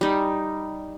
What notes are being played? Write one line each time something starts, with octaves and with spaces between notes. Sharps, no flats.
G3 D#4